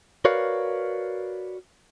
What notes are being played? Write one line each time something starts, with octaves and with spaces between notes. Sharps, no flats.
F#4 A#4 B4 C#5 D5 F5